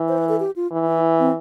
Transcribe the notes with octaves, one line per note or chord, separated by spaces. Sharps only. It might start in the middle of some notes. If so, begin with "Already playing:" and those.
Already playing: E3
C5
B4
A4
G4
F4
E3
E4
C4